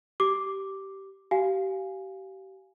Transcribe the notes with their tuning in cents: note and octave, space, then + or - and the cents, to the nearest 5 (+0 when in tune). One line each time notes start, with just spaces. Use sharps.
G4 -15 D6 +0
G4 -30 F5 +0 G#5 +0